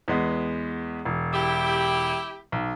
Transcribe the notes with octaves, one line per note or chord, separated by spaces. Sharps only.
E2 G#3 B3
E1
E4 G4
B1